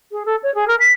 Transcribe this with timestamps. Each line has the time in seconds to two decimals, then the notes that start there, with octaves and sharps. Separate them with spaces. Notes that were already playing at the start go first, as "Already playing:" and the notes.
0.11 G#4
0.25 A4
0.43 C#5
0.54 G#4
0.67 A#4
0.79 B6